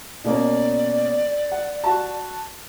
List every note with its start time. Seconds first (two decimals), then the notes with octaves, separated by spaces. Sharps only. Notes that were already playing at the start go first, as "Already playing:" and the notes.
0.24 B2 A#3 C#4 D5
1.52 F#5
1.84 F#4 A5